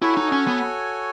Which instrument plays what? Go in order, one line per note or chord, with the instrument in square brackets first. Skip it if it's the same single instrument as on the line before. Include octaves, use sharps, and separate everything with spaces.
[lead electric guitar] E4 [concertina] F#4 A4 C#5 G#5
[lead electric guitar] D#4
C#4
B3